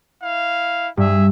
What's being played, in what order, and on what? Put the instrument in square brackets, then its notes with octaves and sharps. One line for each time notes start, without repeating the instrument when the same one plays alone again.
[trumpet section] E4 F5
[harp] G2 [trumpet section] G#4 E5